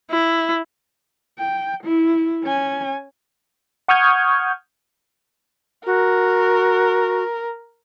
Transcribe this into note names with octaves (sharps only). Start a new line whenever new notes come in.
E4
G5
E4
C#4 G#5
F#5 C#6 D#6 F6 G6 G#6
F#4 A#4